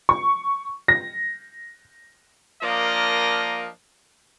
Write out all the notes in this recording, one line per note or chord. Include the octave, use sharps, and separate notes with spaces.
C#6
A#6
F3 A#3 D4 A#4 D#5